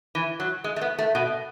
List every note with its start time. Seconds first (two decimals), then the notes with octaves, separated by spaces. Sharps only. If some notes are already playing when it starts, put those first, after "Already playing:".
0.15 E3
0.40 F#3
0.64 G#3
0.76 A3
0.81 B3
0.99 A3
1.15 B2